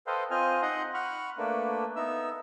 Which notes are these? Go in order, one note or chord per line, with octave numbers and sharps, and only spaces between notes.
A4 B4 C5 D#5 F5 G5
C4 F4 D#5 G#5 F6
D#4 D#5 F#5 A#5 C6
F#5 B5 C#6 F6
A3 A#3 D4 B4
B3 D#4 E5 E6